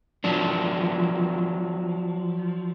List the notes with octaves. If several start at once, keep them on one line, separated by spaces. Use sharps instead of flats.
F3 F#3 D4